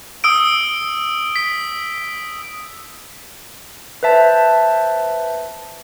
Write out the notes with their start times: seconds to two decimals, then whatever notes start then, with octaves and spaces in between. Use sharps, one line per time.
0.24 D#6 E6 D7
1.36 B6
4.03 B4 C5 E5 A5